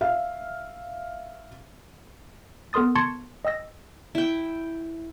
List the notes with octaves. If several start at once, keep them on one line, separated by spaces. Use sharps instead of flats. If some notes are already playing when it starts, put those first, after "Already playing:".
E5 F5
B3 A4 A#4 C6 D#6 A6
A5 C6 C#6 G#6 A6 C#7
D#5 G5 E6 A#6
E4 G5